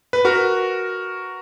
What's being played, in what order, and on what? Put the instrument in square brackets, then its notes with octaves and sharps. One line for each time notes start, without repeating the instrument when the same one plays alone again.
[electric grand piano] B4
F#4 A#4